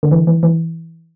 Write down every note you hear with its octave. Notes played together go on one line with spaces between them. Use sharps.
D3
E3
E3
E3